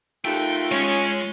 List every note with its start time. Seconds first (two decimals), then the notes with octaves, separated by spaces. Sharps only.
0.25 D#2 A3 F4 G5
0.72 G#3 C#4